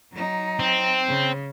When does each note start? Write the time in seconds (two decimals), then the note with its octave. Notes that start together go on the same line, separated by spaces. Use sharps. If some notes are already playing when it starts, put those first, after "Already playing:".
0.13 F#3 D#4
0.59 C4
1.08 C#3